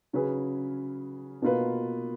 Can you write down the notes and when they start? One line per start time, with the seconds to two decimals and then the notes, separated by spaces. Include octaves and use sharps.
0.13 C#3 F#3 C#4 G#4 B4
1.42 B2 A#3 F4 B4